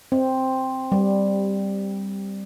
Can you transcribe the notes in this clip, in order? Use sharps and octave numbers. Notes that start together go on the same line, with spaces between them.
C4
G3